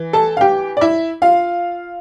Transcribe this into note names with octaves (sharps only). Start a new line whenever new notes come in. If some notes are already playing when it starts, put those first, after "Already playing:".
Already playing: E3
A4 A5
F5
G4 G5
D5
E4 E5
F4 F5